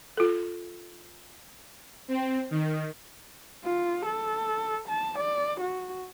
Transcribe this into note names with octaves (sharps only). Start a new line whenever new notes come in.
F4 A4
C4
D#3
F4
A4
A5
D5
F#4